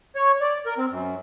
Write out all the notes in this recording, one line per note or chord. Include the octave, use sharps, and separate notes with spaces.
C#5
D5
A#4
C4
F#2